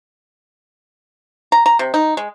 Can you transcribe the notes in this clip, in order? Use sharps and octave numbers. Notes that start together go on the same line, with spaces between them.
A#5
A#5
C3
D#4
G#3